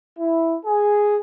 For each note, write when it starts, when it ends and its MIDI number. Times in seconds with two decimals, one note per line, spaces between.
0.19 0.57 64
0.66 1.18 68